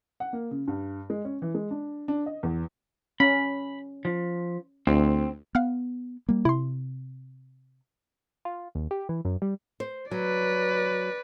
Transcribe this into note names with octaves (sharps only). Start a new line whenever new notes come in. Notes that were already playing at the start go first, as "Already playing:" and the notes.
F#5
A#3
C#3
G2
G#3
C#4
E3
G#3
D4
D4
D#5
E2
C#4 B5
F3
D2 C4
B3 F5 F#5 F6
G3 A#3
C3 E4 C6
F4
D#2
G4
E3
F#2
G3
C5
F#3 B4 D5